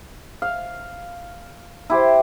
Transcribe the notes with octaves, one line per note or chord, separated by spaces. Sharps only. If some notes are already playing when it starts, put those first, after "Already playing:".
F5
E4 G4 C5